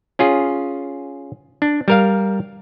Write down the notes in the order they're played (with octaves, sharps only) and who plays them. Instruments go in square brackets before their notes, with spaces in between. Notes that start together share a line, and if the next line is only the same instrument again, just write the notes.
[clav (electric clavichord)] C#4 F4 G#4
D4
G3 A#4 F5